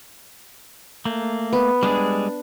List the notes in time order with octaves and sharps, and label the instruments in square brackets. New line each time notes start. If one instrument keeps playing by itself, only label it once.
[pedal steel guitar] A3 A#3
[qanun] B3
[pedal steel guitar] G3 G#3 G#4 [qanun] D4